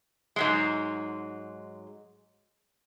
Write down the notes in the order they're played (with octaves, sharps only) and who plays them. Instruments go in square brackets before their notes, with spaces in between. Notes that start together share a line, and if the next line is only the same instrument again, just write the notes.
[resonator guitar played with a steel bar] G#2 F#3 G#3